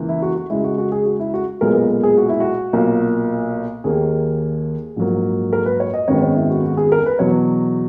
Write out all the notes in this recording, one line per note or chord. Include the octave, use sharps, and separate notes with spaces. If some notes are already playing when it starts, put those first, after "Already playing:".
Already playing: C#2 C#3 E3 A#3
E4
F#4
F#4
C#2 C#3 G#3 E4
F#4
F#4
G#4
F#4
E4
F#4
B1 A#2 G#3 B3 A#4
A#4
A#4
G#4
F#4
E4
F#4
B1 A#2 A#3
D#2 D#3 A#3 G#4
A#1 G#2 F#3 A#3
A#4
B4
C#5
D#5
G#1 F#2 D#3 G#3 B3 C#5
C#5
E4
F#4
F#4
G#4
A#4
B4
E2 B2 F#3 B3 C#5